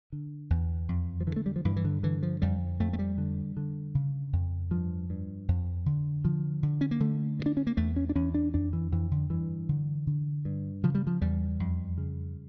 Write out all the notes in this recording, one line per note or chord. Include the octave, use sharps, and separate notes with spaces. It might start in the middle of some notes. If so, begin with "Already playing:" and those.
D3
E2
F2
F3
D3 E3
A3
G3
F3
G2 E3
E3
D3
D3 E3
F3
F2 G3
F2 A3
A3
G3
D3
D3
C#3
F2
G2 F3
G2
F2
D3
D3 F3
D3
C#4
A#3
D3 A3
G2
D4
C#4
A#3
E2 A3
C#4
D4
E2 C#4
D4
F2 D4
E3
F2 E3
D3
G2 E3
D3
D3
G2
C#3 F3
G3
F3
E2 G3
F2
C#3